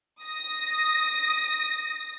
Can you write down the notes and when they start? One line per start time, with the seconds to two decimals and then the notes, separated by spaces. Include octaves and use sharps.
0.22 D#6 A#6